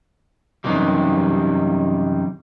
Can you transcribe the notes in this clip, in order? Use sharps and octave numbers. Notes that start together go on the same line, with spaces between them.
F#2 C3 D#3 E3 G3